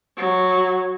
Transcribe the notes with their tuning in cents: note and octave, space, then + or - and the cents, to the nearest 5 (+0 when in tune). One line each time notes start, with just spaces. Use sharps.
F#3 -5